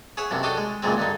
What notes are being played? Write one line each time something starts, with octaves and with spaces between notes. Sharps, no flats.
G#4 C#5 E5 F#5
B1 F#2 C3
D4 F#4 G4 A4 D#5
G#3
C#2 F#2 A#2 G#3 C4
G2 D3 D#4